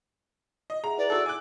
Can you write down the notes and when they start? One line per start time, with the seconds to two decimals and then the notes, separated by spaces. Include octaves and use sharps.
0.70 D#5
0.84 G#4 E5 F#5 A#5
0.98 E4 B4 D5
1.10 F#4 A4 E6
1.26 G#5 D6 F#6